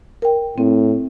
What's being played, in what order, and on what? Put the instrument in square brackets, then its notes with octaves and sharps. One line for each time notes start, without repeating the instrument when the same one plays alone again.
[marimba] A#4 G5
[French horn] A2 [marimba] C4